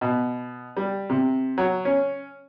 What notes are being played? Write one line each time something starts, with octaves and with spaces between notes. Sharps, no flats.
B2
G3
C3
F#3
C#4